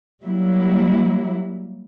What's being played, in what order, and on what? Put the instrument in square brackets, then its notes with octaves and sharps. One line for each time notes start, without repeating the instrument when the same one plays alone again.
[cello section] F#3 G3 A#3 E4